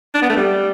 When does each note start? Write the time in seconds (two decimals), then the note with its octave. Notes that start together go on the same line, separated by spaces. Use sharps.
0.14 D4
0.22 B3
0.29 A3
0.37 G3